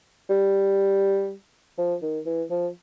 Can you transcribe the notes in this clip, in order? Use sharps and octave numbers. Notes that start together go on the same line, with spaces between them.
G3
F3
D#3
E3
F3